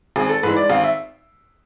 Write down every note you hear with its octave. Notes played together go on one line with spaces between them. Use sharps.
G#1 G#4
A4
G#2 E3 G#3 B4
D5
G#1 F5
E5